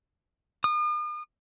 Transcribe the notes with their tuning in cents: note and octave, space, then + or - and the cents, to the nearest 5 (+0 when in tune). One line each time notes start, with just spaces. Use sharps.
D#6 -45